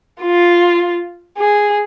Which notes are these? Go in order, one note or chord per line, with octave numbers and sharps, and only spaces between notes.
F4
G#4